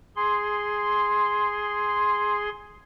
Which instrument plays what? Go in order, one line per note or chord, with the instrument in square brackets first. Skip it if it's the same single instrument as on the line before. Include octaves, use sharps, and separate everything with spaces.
[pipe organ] G#4 C6